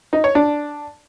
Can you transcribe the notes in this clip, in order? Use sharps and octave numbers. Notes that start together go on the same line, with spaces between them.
D#4
C#5
D4